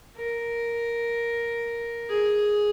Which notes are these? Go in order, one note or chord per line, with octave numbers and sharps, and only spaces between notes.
A#4
G#4